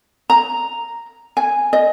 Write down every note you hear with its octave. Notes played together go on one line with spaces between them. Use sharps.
A#5
G#5
D#5